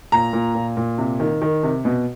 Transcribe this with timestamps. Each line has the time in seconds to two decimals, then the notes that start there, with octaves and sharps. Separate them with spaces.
0.12 A#2 A#5
0.33 A#2
0.55 A#2
0.77 A#2
0.98 C3
1.20 D#3
1.42 D#3
1.63 C3
1.85 B2